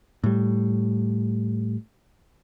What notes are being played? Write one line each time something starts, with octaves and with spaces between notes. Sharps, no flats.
A2 G3